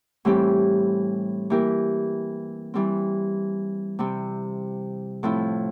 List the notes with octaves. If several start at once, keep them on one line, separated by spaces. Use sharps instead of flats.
A2 E3 G3 C4 G4
E3 A#3 E4 G4 A#4
E3 G3 C4
C3 G3 C4
A2 F3 C4 E4